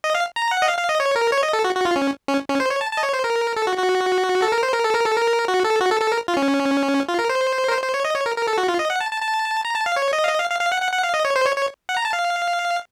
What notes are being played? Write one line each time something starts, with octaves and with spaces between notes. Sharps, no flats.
D#5
F5
A#5
F#5
D#5
F5
F5
D#5
C#5
A#4
C#5
D#5
A4
F#4
F#4
F4
C#4
C#4
C#4
C5
C#5
A5
A5
D#5
C#5
C5
A#4
A4
F#4
F#4
A4
A#4
C5
A#4
A4
A#4
A4
A#4
F#4
A4
F#4
A4
A4
A#4
F4
C#4
F4
A#4
C5
A#4
C5
C5
C#5
D#5
C#5
A#4
A#4
A4
F#4
F4
D#5
F#5
A5
A5
A5
A#5
A5
F5
C#5
D#5
F5
D#5
F5
F5
F5
F#5
F#5
F#5
F5
D#5
C#5
C5
C#5
C#5
F#5
A#5
A5
F5